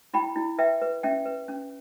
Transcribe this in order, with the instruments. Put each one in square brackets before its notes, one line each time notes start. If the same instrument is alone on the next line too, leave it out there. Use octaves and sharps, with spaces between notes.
[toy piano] E4 G5 B5
E4
B4 E5 G5
B4
C#4 E5 G5
B4
C#4